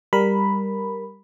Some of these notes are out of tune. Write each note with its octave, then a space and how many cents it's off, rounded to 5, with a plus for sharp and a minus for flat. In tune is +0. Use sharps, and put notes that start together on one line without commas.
G3 +10 A#4 +5 B5 +0